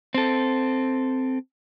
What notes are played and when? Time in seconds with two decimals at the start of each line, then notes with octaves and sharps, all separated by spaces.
0.14 C4 A4